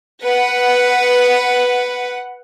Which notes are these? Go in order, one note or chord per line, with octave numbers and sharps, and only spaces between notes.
B4 F#5